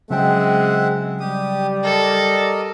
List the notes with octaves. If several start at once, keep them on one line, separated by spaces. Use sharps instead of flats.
C#3 F#3 G#3 C4 E5 F#5 G5
G3 G4 D#6
A4 A#4 D5 D#5